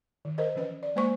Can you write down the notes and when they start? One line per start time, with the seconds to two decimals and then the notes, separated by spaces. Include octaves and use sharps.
0.25 D#3
0.38 A#4 C5 D#5
0.55 E3 F3 C#4 B4
0.83 D5
0.96 G#3 A#3 C5 G#5 C#6